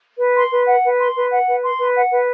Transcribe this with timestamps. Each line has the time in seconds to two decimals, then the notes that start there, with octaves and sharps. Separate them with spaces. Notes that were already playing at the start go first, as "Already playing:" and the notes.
0.18 B4
0.34 C6
0.51 B4
0.66 F#5
0.83 B4
0.99 C6
1.14 B4
1.30 F#5
1.46 B4
1.62 C6
1.78 B4
1.94 F#5
2.10 B4